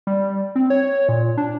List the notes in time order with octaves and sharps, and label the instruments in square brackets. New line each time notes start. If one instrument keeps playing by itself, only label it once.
[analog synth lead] G3
C4
C#5
A#2
D4